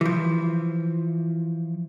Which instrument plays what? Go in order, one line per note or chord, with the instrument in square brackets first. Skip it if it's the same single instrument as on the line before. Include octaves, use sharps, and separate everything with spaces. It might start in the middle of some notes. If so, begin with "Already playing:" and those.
[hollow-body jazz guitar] E3 F3